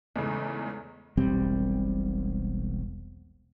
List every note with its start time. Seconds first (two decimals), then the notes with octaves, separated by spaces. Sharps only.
0.16 E2 G#2 C#3 A3
1.17 E1 B1 G3 C4